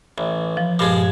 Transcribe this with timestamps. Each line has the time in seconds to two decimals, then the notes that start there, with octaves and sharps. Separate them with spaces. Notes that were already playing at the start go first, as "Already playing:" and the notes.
0.18 A1
0.57 F3
0.79 G2 A#2 F3 G#3